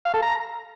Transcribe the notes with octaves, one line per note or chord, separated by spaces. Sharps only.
F5
A4
A#5